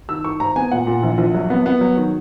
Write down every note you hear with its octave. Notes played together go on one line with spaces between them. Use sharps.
D#3 E6
D#3 C#6
G#2 A#5
B3 G#5
A#2 F#5
A#2
A#1
A#1
F#3
B3
B3
F#3
D#3